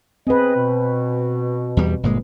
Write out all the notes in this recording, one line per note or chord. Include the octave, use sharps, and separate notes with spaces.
C4 G#4 B4 D#5
B2
E2 G3
G1 A#2 G#3